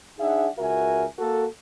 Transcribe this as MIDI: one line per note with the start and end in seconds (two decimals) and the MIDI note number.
0.19 0.48 62
0.19 0.48 63
0.19 0.48 68
0.19 0.48 76
0.19 0.48 78
0.59 1.06 37
0.59 1.06 66
0.59 1.06 70
0.59 1.06 76
0.59 1.06 80
1.19 1.46 58
1.19 1.46 66
1.19 1.46 69